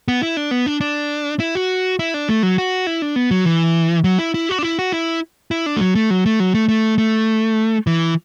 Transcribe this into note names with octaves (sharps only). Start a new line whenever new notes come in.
B3
E4
D4
B3
D4
D4
E4
F#4
E4
D4
A3
F#3
F#4
E4
D4
B3
F#3
E3
F#3
E4
E4
F#4
D4
E4
F#4
E4
E4
D4
A3
F#3
A3
F#3
A3
F#3
A3
A3
A3
E3